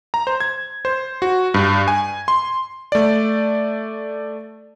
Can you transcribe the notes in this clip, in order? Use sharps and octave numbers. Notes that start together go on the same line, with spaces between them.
A#5
C5
G#6
C5
F#4
G2
G#5
C6
A3 D5